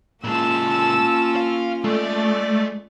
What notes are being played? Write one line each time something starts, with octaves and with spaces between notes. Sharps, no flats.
A#2 G#3 A#3 C#4 F4 A5 E6
F5
G#3 A3 D5